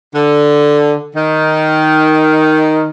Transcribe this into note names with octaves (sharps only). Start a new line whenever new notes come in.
D3
D#3